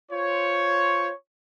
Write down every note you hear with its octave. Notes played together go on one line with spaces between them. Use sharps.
F4 C5 C#5